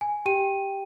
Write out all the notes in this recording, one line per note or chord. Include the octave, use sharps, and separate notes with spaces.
G#5
G4 G5 D#7